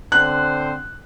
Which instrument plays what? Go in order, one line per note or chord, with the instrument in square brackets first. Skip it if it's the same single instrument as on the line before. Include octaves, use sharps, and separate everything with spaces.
[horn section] D3 C4 C5 [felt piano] F#6